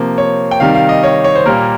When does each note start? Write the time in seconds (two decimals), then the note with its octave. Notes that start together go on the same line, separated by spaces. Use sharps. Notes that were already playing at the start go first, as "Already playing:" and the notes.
Already playing: C3 F3 A#3
0.18 C#5
0.51 G5
0.60 C3 D#3 G3 F5
0.75 F5
0.89 D#5
1.03 C#5
1.24 C#5
1.35 C5
1.46 A#2 G3 A#3 A#4